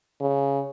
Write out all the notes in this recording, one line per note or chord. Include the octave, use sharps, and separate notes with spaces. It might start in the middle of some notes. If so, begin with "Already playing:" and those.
C#3